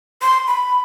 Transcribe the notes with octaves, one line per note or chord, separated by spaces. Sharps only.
C6
B5